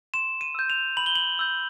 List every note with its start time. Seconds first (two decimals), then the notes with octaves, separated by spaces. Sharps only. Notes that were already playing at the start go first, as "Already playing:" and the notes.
0.14 C6 E7
0.41 D#7
0.55 E6 G6
0.70 F7
0.97 B5 F#7
1.06 G7
1.15 F#7
1.39 E6 G6